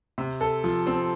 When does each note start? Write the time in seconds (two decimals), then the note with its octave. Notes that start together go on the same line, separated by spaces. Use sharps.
0.18 C3
0.41 A4
0.64 F3
0.87 C4